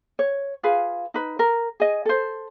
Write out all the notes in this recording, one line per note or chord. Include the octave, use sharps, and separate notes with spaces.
C#5
F4 G#4 B4 F5
D#4 B4
A#4
G#4 D#5
A4 C5